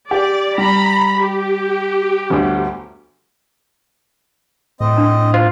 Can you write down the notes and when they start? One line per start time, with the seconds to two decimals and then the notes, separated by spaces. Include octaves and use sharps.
0.11 G4 D5
0.58 G3 A#5 B5
1.20 G4
2.30 G1 D2
4.80 A2 C4 D#5
4.97 D4
5.34 F4 C5